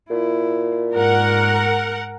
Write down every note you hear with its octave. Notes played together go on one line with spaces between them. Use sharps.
A#2 E4
G#2 A#4 F#5